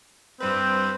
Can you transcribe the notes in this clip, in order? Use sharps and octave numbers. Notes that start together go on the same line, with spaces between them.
G2 G3 C4 B4